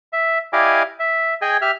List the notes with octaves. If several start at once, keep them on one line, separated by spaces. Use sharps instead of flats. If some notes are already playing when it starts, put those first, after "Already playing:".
E5
E4 G4 D5 D#5 F5 G#5
E5
G#4 D#5 G5 G#5
G4 E5 F6